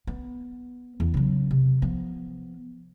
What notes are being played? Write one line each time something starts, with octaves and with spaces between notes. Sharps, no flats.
B3
E2
C#3 F#3
C3
F3 B3